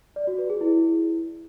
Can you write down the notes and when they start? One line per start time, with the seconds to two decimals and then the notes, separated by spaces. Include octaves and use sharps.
0.16 D5
0.27 F#4
0.38 B4
0.50 G#4
0.61 E4